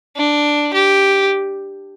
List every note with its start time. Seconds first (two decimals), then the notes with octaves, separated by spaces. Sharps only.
0.16 D4
0.73 G4